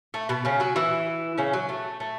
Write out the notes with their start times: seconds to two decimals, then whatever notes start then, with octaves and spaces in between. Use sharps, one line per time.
0.14 A3
0.29 B2 B3
0.45 C#3 C#4
0.60 F#3 F#4
0.76 E3 E4
1.38 C#3 C#4
1.53 F#3
1.69 A3
2.00 A3